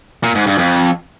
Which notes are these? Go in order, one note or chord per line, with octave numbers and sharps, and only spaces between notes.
A#2
G#2
G2
F2